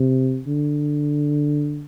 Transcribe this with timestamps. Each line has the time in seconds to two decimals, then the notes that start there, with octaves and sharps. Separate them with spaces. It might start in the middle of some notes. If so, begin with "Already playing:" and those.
Already playing: C3
0.47 D3